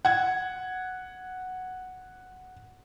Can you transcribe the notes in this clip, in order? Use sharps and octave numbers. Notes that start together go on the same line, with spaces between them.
F#5 G#6